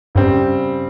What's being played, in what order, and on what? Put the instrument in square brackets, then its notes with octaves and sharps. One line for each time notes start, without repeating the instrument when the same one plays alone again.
[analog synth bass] G2 [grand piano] C#3 G3 C4